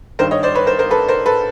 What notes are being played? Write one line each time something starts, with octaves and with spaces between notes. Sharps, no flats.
G2 D#3 G3 A#4 C5
C#5 D#5
C5 D5
B4 C#5
A#4 C5
A#4 C5
A4 B4
A#4 C5
A4 B4